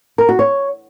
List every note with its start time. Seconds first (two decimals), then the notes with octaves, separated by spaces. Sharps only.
0.18 A#4
0.29 F#4
0.39 C#5